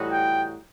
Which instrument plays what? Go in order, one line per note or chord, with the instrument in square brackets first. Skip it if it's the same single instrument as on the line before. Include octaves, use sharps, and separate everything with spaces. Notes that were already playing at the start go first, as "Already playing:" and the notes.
Already playing: [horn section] A2 E3 G3 D#4 F#4
[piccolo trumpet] G5